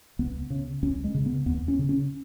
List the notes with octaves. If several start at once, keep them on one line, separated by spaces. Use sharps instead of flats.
C#2 B3
C#3
C#2 C#4
G#3
C#3
B3
D#2 B3
C#4
C#3
C#4